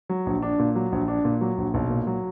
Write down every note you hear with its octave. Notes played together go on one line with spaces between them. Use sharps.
F#3
A#1
D4
A#2
F#3
A#1
D4
A#2
F#3
A#1
B1
A#2
F#3